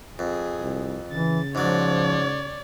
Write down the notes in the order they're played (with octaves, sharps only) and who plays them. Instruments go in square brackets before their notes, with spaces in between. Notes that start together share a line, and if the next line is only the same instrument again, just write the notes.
[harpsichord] F2 [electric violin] G#4
[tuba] C2
[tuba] C#3 [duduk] E3 [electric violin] A6
[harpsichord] G#2 F#3 [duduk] F3 [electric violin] C#5 D5